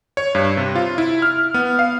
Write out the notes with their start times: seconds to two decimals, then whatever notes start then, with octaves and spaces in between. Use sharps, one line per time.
0.17 C#5
0.35 G2
0.57 C3
0.75 F4
0.98 E4
1.22 F6
1.54 B3
1.79 F5